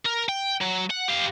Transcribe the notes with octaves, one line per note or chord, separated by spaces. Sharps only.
A#4
G5
F#3
F#5
G4 F5